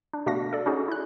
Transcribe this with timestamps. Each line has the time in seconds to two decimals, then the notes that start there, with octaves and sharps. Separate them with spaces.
0.13 D4
0.26 B2 A3 D4 F#4 F5 A#6
0.53 A4 D5
0.66 C#4 D#4 F#4 G#4
0.88 E4 F#6